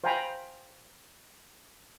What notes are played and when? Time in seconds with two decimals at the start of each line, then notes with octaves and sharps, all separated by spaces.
0.04 C5 F5 G5 G#5 A#5 B5